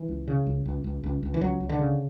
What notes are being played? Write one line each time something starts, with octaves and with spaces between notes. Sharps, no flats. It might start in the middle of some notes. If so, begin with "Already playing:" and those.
Already playing: E3
C#2
C#3
C#2
C#2
C#2
C#2
C#2
E3
C#2 F#3
C#2
D3
C#3